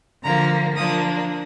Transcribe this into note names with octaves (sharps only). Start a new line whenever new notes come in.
D3 F3 A#3 A#5
F3 A#3 D4 D#6